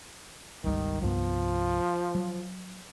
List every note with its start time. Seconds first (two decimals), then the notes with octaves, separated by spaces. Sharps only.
0.64 G1 C#2 D#3 G3
1.02 C2 G2 F3 B3
2.15 F#3